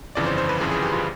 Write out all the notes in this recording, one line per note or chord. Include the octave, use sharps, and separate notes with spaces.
G1 F2 C#3 E3 D5
C5
C5
B4
G1 F2 C#3 E3 G#4
G#4
G4
F4